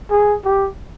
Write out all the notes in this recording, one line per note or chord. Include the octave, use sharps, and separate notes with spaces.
G#4
G4